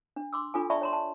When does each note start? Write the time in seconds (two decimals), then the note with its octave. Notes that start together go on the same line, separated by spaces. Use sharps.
0.16 D4
0.33 C6 D6 E6
0.54 D4 F4 A4 G#5
0.70 D5 E5 G5 A5 B5 C#6
0.81 C#5 A#5 C6
0.93 A5